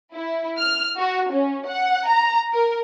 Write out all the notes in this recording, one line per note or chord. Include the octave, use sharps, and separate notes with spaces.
E4
F6
F#4
C#4
F#5
A#5
A#4